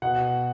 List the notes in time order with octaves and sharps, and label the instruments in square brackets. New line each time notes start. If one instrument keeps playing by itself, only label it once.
[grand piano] B2 F#5